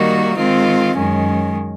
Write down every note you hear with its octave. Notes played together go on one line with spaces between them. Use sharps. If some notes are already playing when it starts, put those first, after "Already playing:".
Already playing: D#3 G3 A#3 D#4 F#4
D#3 G#3 C4 F4
F#2 D#3 G#3 C#4